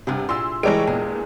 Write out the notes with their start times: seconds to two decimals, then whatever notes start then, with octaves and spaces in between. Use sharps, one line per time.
0.07 G2 C3 B3 G#4
0.29 A#2 E4 G#4 C6 E6
0.63 E3 G3 G#3 D4 A#4 C#5 D7
0.87 E2 A#2 G#4